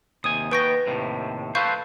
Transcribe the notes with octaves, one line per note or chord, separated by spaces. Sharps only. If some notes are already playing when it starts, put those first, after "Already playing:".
D#2 C3 G#5 D#6
D#2 B3 B4 G5 C#6 A#6
D#2 A2 C3
A4 B4 C5 F5 C#6 G6